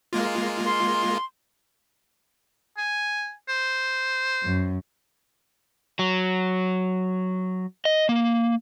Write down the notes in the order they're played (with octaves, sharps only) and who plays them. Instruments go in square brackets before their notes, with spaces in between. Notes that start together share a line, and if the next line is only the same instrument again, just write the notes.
[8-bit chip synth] G#3 A#3 F4
[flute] C6
[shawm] G#5
C5
[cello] F#2
[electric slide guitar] F#3
D#5
A#3